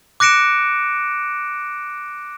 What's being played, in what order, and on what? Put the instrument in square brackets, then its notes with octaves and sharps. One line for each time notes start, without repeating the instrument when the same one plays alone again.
[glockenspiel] D6 F#6 A#6 C#7 D7 E7